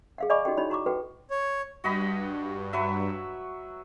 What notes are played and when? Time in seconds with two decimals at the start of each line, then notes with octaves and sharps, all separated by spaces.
0.18 G#4 F5 F#5
0.30 D5 D#5 G#5 B5 C#6 D6
0.45 D#4 F#4 G4 A4 G5
0.57 D#4 E4 F#4 C#5 D5 B5
0.70 F#4 A#5 C#6 D6
0.86 F#4 A4 B4 F#5 G5
1.30 C#5
1.84 G2 F#4 D#5 B5
2.73 F#3 B4 E5